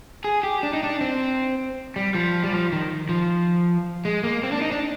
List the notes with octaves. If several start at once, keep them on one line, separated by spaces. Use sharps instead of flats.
G#4
G4
D4
D#4
D4
C4
G3
F3
G3
F3
D#3
F3
G#3
A#3
C4
D4
D#4
D4